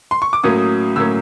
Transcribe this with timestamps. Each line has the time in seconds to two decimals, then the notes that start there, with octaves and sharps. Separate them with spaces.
0.11 C6
0.22 C#6
0.33 D6
0.43 A2 F#3 A#3 C#4 D#6
0.96 A2 F#3 A#3 C#4 E6